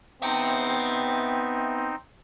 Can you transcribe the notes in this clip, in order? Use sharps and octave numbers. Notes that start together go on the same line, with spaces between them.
B3 C4 D#4 E5 G5